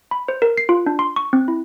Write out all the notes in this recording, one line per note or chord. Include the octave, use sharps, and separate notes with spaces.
B5
C5
A#4
C7
F4
D4
C6
C#6
C4
E4